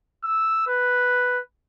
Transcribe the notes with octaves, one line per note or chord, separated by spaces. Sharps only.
E6
B4